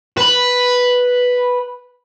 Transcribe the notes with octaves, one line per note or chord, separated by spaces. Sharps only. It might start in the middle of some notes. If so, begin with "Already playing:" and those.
B4 B5